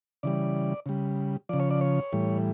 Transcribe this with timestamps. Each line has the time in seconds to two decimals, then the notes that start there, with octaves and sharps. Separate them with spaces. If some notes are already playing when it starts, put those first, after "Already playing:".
0.23 C#3 E3 G3 D5
0.86 C#3 G3
1.49 C#3 F3 D5
1.60 C#5
1.71 D5
1.81 C#5
2.12 A2 E3 G3